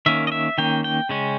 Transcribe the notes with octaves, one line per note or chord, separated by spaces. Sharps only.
D#3 A#3 C#4 E5
D#5
E5
D#3 A#3 C#4 G5
G5
C#3 G#3 C#4